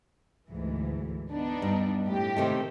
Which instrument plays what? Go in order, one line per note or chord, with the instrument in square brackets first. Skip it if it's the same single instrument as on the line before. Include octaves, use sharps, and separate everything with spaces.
[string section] D2 G#2 E3
B3 D4 D#4
[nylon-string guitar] G2
[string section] A2 G4
[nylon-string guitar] C3 D#3 A3